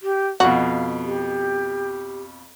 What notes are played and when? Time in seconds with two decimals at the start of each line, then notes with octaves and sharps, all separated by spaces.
0.02 G4
0.40 F2 B2 F#4 F5
1.03 G4